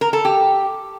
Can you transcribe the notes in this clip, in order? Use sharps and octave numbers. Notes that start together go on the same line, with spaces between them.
A#4
A4
G4